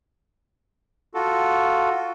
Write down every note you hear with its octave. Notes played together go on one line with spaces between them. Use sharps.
F4 F#4 A4